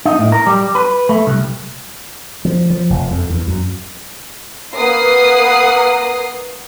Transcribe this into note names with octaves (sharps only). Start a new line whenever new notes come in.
D#4
A2
A#4
G3
B4
A3
C2
F3
F3
F1
F2
E2
F#2
A#3 B4 F#5 D#6 C7